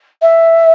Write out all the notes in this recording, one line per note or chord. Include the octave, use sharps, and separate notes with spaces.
E5